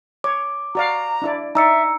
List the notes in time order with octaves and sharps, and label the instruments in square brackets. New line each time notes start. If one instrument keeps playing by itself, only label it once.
[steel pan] C#5 [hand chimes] D6
[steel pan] F#4 D5 F5 [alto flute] A#5
[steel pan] D4 E4 D5
[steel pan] D#4 D5 [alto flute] E5 [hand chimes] A#5 E6 C#7